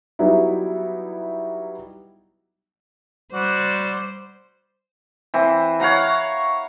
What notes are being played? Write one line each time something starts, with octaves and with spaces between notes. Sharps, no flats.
F#3 G3 B3 D#4 E4
G3 F#4 C5 D5
E3 C4
C#5 F5 F#5 A#5